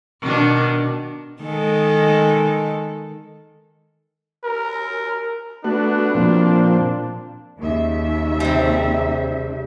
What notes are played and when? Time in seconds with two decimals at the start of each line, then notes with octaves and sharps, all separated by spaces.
0.21 B2 D#3 D4
1.42 D#3 G#3 A4
4.44 A#4
5.64 A3 B3 D4 F#4
6.15 A#2 F3 C4
7.58 D#2 C#3 E5
8.40 C3 G3